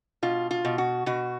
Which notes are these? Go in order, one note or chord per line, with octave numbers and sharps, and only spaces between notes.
B2 F4
F4
B2
F#4
B2 F#4